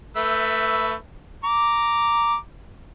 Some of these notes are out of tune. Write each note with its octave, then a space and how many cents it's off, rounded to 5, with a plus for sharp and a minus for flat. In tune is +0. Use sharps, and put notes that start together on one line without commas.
A3 +25 B4 +0 E5 +0
A#5 +0 D6 +0